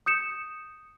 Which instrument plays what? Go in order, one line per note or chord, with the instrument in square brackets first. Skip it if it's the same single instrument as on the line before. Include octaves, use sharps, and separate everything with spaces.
[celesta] D#6 G6 C#7 E7